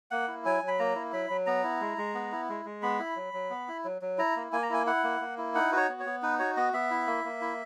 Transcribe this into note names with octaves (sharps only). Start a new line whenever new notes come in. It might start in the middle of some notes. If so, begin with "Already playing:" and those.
A#3 F#5
E4
F#3 G#5
F#3
B5
A#3 A#5
E4
F#3 B5
F#3
B3 A#5
E4
G#3
G#3
B3
E4
G#3
G#3
B3 B5
E4
F#3
F#3
B3
E4
F#3
F#3
E4 A#5
A#3
A#3 G#5
A#5
E4 G#5
E4 F#5
A#3
A#3
E4
D#4 F#5
F#4 B4 C#5
B3
C#5
B3
D#4 B4
F#4 C#5
B3 D#5
B3 E5
E4
A#3
A#3
E4